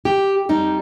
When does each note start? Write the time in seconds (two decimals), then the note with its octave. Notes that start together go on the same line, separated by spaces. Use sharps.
0.05 G4
0.49 F2 G3 D#4